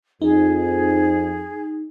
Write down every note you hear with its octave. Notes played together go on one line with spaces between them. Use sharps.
F2 D#4 G#4